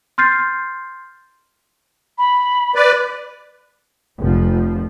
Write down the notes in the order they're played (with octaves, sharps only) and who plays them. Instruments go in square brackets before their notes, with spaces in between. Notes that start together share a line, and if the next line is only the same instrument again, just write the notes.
[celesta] C6 F6 G6 A6 C7
[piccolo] B5
[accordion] B4 D5
[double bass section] F1 F3